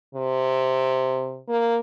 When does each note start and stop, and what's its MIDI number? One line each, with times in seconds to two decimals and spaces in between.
0.15 1.40 48
1.48 1.78 58